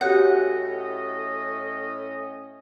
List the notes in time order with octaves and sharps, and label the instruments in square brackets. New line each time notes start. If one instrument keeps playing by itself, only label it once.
[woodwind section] A2 C#4 D#5 [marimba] F#4 G4 C#5 [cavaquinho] F#5